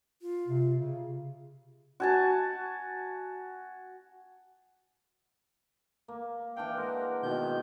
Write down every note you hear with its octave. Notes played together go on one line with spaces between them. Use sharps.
F4
C3
C#3
F#4 G#5 A5
A#3
E3 D4 F5 G5
G#3 A#4 F#5
B2 D#3 G6